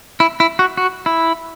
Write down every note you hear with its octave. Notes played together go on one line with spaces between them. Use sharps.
E4
E4
F#4
F#4
E4